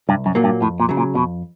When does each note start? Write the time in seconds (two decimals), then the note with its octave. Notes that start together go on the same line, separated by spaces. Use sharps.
0.09 C2 G2
0.26 F#2
0.35 A#2 F#3 A#3
0.44 G2
0.62 F2 A2
0.80 A#2
0.89 C#3 F#3
0.97 A#2
1.15 F2 B2